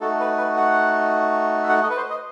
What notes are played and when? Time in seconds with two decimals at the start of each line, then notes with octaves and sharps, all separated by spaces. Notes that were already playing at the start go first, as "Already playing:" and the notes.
0.01 A3 D#4 F#4 A4
0.20 B4
0.38 B4
0.57 F#5
1.64 E5
1.69 F#5
1.83 D#5
1.90 B4
1.97 C5
2.10 D#5